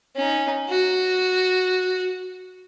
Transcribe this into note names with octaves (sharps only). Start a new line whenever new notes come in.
C#4 D#4
F#4